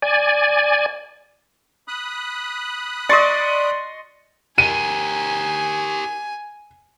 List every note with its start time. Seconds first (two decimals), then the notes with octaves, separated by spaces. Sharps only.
0.02 D5 G#5
1.88 B5 D#6 F#6
3.09 D5 D#5 C6 C#6 A6
4.58 G4 A#4 G#5 D#7